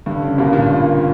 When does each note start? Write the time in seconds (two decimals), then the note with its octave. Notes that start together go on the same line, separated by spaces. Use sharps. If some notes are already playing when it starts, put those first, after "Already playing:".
0.06 G2 D3
0.22 C#3
0.38 B2 D3 G3 A#3
0.53 A#2
0.69 G2